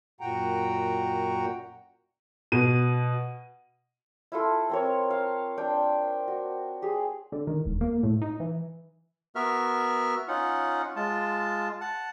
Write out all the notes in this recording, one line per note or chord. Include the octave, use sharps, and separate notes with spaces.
F#2 A#2 F#4 F#5 G5 A#5
B2 D#7
E4 F4 A4
C4 A#4 C#5
F5
D4 G5
F#4
G4 G#4
D3
D#3
E1
A#3
A2
D#4
E3
B3 F#4 A#4 E5 F6
C#4 D#4 F4 F#5
G#3 F4 A5
F#5 A5